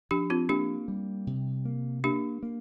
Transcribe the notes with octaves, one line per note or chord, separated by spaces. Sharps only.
F3 D4 G4
C4 F4
A#3 D4 G4
G3
C3
A#3
A#3 D4 G4
A#3